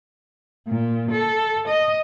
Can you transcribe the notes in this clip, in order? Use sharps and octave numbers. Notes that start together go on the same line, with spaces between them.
A#2
A4
D#5